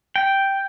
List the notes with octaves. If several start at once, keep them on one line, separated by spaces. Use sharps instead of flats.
G5